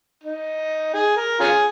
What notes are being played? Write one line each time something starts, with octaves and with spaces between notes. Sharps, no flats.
D#4
G#4
A#4
C#4 F4 G#4